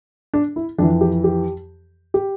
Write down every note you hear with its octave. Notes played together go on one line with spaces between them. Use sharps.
D4
E4
F2 E3 D4
G4
G4
G4